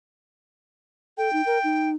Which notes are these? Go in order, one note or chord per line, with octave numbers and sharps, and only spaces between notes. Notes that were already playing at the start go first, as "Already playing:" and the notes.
A4 G5
D#4
A#4
D#4